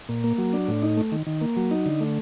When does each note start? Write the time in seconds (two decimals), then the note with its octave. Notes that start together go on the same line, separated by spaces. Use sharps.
0.09 A#2
0.24 A#3
0.38 F#3
0.53 D4
0.68 A2
0.83 D#4
0.97 A3
1.12 D#3
1.27 D#3
1.41 A#3
1.57 F#3
1.71 D#4
1.86 D3
2.01 A3